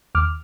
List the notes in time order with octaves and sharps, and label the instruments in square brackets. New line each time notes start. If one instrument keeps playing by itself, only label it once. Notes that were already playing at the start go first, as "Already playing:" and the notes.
[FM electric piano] D#2 D6 F6